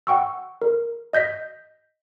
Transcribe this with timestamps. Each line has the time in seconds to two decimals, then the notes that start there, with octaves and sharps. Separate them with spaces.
0.07 F#5 G5 C#6 E6
0.62 A#4
1.13 D#5 G6 A#6 B6